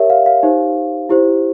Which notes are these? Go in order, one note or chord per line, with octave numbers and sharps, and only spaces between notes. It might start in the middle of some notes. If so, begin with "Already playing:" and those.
Already playing: G4 A#4 C#5 E5
F5
F5
D#4 G4 C5
E4 G4 C5